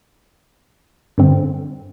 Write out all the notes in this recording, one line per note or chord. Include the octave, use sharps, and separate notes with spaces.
G2 D3 C4